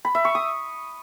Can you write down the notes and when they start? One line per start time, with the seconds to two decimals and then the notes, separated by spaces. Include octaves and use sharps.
0.05 B5
0.15 E5
0.25 C#6
0.35 D#6